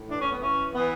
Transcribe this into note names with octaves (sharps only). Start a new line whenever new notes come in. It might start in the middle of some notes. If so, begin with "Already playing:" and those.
Already playing: A2
E3 D4
C#4
B3
E3 C#4
E3 B3